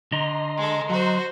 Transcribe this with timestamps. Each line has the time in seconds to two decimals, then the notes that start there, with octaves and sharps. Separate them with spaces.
0.12 D3 D#5 A#5 C6
0.58 G#3 A4
0.90 F#3 F#4 C5